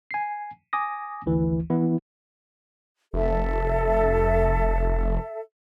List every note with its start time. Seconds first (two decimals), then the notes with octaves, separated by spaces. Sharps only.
0.11 G#5 C7
0.73 G#5 D6 D#6 A#6
1.26 G1 D2 E3
1.70 E3 B3 E4
3.14 F1 A4 E5